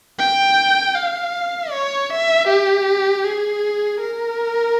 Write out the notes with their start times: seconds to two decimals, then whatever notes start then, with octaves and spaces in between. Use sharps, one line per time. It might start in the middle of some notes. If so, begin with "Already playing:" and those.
0.19 G5
0.95 F5
1.71 C#5
2.10 E5
2.48 G4
3.24 G#4
4.00 A#4